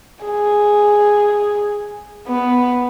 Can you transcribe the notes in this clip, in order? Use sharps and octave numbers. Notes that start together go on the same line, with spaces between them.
G#4
B3